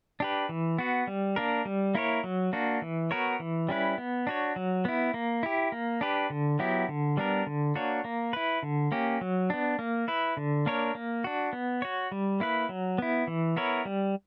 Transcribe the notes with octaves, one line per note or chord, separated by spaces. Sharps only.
D4 G4 B4
E3
B3 F#4
G3
A#3 D4 A#4
G3
A#3 E4 A#4 C#5
F#3
A#3 D4 F#4
E3
B3 F#4 A#4 C#5
E3
G3 C#4 E4 B4
B3
D4 F#4 C#5
F#3
B3 E4
A#3
E4 G4
A#3
D4 G4 B4
D3
F#3 B3 E4 G4
D3
G3 B3 D4 A#4
D3
A#3 D4 F#4 C#5
A#3
E4 B4
D3
A#3 C#4 G4
F#3
B3 D4
A#3
E4 B4
D3
A#3 D4 A#4 C#5
A#3
D4 F#4
B3
F#4 C#5
G3
A#3 E4 B4
F#3
B3 E4
E3
B3 E4 A#4 C#5
G3